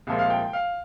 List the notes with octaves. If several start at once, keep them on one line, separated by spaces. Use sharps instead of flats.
C2 A#2 F3 G#3
F5
G5
F5